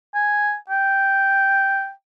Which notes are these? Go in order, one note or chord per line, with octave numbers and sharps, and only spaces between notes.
G#5
G5